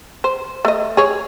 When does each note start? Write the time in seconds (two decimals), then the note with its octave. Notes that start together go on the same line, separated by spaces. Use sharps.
0.24 C5
0.65 A3 D#5
0.97 G#4 C#5